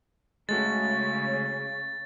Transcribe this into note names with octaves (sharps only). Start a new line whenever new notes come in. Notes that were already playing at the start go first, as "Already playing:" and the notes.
C#3 G#3 A3 C#4 F#4 A6